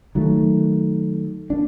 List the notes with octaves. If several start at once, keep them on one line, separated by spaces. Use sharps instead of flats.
D#3 F#3 A3
A#3 D4